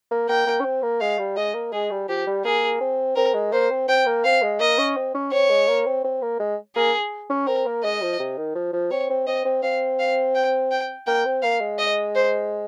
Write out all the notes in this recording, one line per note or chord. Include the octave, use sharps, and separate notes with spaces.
A#3
A#3 G5
A#3
C#4
C4
A#3
G#3 F5
G3
G#3 D#5
A#3
G#3 G#4
G3
F3 G4
G3
A#3 G#4
C4
C4 A#4
G#3
A#3 C5
C4
C4 G5
A#3
C4 F5
G#3
A#3 D#5
C#4
C4
C#4
C4 C#5
G#3
A#3
C4
C4
A#3
G#3
A#3 G#4
C#4
C4 A#4
A#3
G#3 D#5
F3
C3
D#3
F3
F3
C4 C#5
C4
C4 D#5
C4
C4 F5
F5
G5
G5
A#3 G5
C4
A#3 F5
G#3
D#5
C5